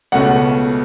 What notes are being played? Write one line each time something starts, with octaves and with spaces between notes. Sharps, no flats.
C#2 B2 A3 C#4 F#5